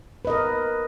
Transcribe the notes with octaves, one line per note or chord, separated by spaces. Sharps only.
A#4 B4 D#5